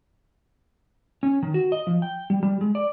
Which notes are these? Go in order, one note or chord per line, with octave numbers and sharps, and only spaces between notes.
C#4
D#3
F#4
D#5
F3
G5
G3
G3
G#3
D5